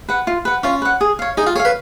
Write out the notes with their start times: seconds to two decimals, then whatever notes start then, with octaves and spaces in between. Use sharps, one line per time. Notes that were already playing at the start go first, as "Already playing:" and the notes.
0.09 B4 F#5
0.27 F4
0.45 B4 F#5
0.63 C#4 F4
0.82 B4 F#5
1.01 G#4
1.19 C#5 F5
1.37 D#4 G#4
1.47 F4
1.55 G#4 C#5
1.60 F5
1.65 B4